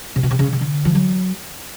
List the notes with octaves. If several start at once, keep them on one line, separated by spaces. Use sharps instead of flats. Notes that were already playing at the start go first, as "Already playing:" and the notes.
C3
B2
C3
C#3
C#3
D3
F3
F#3